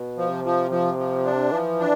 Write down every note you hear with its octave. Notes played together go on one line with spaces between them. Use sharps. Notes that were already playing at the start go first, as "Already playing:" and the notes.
Already playing: B2
F3
C3
F3
F3
F3
D4
E3 F3
D4